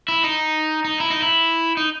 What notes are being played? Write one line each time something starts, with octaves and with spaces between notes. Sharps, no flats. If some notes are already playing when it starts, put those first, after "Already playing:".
E4
D#4
D#4
E4
D#4
E4
D#4